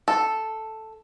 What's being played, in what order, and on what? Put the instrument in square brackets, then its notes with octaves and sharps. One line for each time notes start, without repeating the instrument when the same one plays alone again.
[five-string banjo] A4